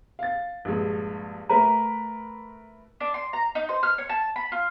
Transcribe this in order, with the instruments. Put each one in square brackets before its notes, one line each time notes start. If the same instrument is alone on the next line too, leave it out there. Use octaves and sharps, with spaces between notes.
[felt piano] F5 A6
A#1 G2 G#3
[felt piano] A3 A#4 B4 [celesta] A#5
[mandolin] D4
C6
A#5
D#4
C5
F6
C#5
A5
B5
F4